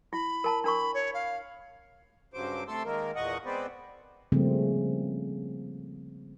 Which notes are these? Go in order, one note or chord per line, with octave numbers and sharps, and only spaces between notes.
E4 B5
A#4 A5 A#5
D4 A#4 B5 C#6
C#5
F5
G2 C#3 F#3 C5 D6
C3 A3 A4 A5 C6 E6
D#3 G#3 A#3 A#4
E2 A#2 D#5 F#5 C#6
G#3 B3 C4 B4 C5 D5
C#3 F3 G3 A3 A#3 C4